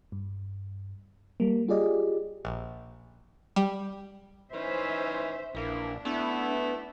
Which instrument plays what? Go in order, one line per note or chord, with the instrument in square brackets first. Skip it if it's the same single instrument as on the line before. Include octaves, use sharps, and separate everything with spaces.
[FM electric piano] G2
G3 A#3
F4 G4 G#4 D5 D#5
[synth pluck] A#1
G3
[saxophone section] E3 C#4 D#4 [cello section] C5 E5
[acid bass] A#1 [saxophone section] E3 A#3 E4 [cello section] D4
[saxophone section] A3 E4 [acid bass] B3